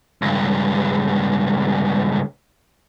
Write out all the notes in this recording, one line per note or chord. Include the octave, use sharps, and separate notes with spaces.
C#2 G2